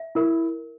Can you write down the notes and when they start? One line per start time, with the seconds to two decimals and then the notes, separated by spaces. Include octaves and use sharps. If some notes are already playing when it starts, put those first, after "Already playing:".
Already playing: E5
0.15 E4 A#4